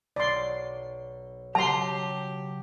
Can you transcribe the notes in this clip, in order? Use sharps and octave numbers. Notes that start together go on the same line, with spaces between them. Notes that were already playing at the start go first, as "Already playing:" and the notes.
B1 D5 C6
C#3 F#3 G4 A5 A#5 C6